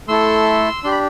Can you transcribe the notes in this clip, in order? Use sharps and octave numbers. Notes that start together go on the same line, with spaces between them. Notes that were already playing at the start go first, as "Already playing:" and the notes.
A3 E4 A4 C6 E6
D4 G4 C6
B5